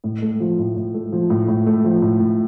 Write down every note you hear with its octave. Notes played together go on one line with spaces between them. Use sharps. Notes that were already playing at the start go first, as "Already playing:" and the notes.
A2
A3
F3
A2
A2
A3
F3
A2
A2
A3
F3
A2
A2